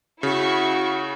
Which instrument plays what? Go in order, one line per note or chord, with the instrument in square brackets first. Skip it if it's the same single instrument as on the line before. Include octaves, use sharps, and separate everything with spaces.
[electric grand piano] C#3 [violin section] E4 C#6 [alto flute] F#4